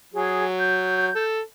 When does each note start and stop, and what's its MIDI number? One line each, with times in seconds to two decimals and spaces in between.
0.13 1.08 54
0.13 0.43 68
0.60 1.20 91
1.15 1.39 69